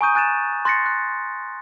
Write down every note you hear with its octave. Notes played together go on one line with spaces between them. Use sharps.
G#5 A#5 C#6 D#6 G6 D#7
G#5 F#6 A6 D#7 E7
C6 F#6 A6 A#6 C7 C#7
F#6